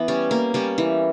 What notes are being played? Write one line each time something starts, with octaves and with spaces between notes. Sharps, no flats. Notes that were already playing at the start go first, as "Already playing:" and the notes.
Already playing: E3 B3
G3 C#4
A#3
G3 C#4
E3